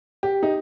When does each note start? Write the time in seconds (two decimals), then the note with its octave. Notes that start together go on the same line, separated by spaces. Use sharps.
0.23 G4
0.43 D#4